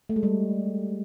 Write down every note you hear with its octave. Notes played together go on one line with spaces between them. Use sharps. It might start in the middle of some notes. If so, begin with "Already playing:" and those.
A3
G#3
G3